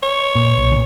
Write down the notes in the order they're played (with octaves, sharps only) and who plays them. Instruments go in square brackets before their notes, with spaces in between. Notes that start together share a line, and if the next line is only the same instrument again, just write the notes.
[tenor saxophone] C#5
[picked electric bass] A#2
B1
A#2 C#3